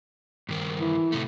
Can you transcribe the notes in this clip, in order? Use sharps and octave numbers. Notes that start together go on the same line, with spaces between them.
G2 D#3 A#4
E3
A2 C3 A3